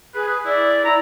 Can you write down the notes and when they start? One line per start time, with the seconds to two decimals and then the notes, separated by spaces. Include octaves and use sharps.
0.15 G#4 B4
0.28 B4
0.45 E4 D5
0.85 E4 A#5